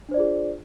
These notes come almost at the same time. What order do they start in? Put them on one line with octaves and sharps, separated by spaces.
D4 C5 D5 F4 G#4